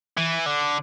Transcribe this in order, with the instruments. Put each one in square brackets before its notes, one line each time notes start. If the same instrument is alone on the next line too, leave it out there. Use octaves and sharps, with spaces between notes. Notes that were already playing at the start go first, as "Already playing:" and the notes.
[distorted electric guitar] E3
D3